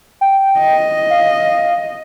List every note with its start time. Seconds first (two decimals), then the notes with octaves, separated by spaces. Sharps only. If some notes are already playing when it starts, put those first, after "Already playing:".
0.21 G5
0.59 D#5
1.10 F5